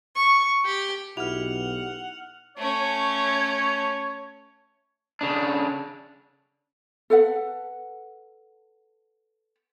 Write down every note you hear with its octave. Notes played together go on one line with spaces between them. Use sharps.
C#6
G4
B1 E4 G4 F#5 F6 F7
A3 C#4 C#5
C#3 D4
A4 B4 F#5